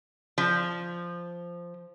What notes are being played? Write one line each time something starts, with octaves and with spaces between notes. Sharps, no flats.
F3